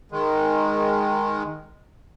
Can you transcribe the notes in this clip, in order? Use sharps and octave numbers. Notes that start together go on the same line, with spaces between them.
D#3 G#3